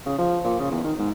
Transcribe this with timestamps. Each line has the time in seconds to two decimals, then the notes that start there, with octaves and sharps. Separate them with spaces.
0.06 C#3
0.18 F3
0.44 A#2
0.60 C#3
0.71 E2
0.84 D#3
0.98 G#2